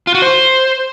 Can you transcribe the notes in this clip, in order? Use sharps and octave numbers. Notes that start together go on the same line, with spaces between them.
F4
F#4
C5